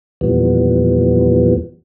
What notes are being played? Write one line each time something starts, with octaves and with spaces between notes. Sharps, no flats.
E2 A#2 E3 F3 G3 B3